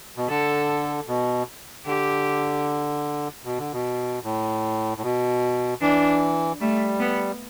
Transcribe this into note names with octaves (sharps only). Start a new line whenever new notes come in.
B2
D3 A4
B2
D3 G4
B2
D3
B2
A2
A2
B2
E3 D4
G3 A3
B3